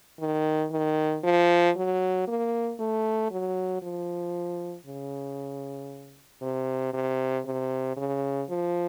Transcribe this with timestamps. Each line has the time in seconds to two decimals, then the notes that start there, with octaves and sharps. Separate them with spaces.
0.20 D#3
0.72 D#3
1.24 F3
1.76 F#3
2.28 A#3
2.79 A3
3.31 F#3
3.82 F3
4.86 C#3
6.42 C3
6.93 C3
7.46 C3
7.97 C#3
8.49 F3